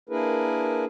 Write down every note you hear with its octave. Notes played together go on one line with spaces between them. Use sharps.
A#3 D4 E4 G#4 A#4 B4